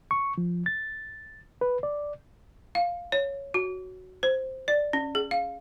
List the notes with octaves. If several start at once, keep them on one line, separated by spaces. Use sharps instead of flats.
C#6
F3
A6
B4
D5
F5
C#5
F#4
C5
D5
C#4
G#4
F5